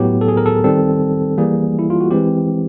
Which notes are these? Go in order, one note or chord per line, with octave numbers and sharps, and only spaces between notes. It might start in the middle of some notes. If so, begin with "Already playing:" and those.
Already playing: A2 F#3 B3 G4
A4
G#4
A#4
A4
D#3 G3 C4 A4
E3 G3 A#3 G#4
E4
F4
F#4
E3 G#3 C4 G4